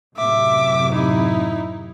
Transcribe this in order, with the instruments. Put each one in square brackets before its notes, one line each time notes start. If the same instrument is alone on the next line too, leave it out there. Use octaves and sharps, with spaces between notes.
[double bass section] F#2 A2 C3 [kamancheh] E5 D6
[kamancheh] D#4 E4